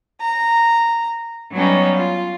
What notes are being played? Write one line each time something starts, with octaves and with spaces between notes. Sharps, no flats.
A#5
F#3 G3 B3 C#4 D#4
F4